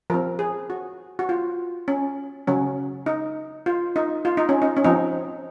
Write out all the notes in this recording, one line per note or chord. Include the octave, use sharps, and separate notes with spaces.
F3 C4 A#4
G#4
F#4
F#4
F4
C#4
C#3 F#3 C#4
D#4
F4
D#4
F4
D#4
C#4
D#4
C#4
F3 C4 D#4